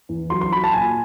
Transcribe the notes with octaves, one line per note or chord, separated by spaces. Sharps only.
E2
F#3 C6
C6
F#3 B5
A5
A#2 G#5